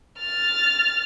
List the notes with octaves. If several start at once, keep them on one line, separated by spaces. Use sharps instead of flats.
F6 A6